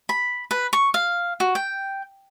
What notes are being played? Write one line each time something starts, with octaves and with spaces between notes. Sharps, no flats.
B5
B4
C#6
F5
F#4
G5